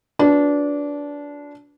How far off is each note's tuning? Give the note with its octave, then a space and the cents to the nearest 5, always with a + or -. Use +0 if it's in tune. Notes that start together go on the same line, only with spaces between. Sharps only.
D4 -20 F#4 -45 B4 +0